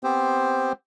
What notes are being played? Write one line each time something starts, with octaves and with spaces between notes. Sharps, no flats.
B3 C4 G4 C5